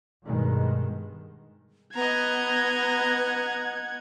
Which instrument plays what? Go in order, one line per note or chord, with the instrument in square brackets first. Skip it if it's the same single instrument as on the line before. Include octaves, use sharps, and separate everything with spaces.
[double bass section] G2 B2 D#3 G#3
[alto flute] B3 [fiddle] D#5 A#5 [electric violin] F#5 G#6